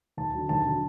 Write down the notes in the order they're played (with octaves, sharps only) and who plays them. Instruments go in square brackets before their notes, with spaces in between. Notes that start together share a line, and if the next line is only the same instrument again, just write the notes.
[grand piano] D#2 A5
D3 F#3
D#2 A5
D3 F#3